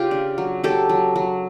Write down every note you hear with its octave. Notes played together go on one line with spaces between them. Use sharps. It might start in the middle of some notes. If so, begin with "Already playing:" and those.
Already playing: C#3 F4 G4
D4
F#3
F#3 G4 A4
F#3
F#3